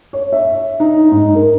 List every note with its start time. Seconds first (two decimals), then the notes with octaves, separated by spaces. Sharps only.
0.13 C#5
0.32 E5
0.80 D#4
1.12 G#2
1.35 A#4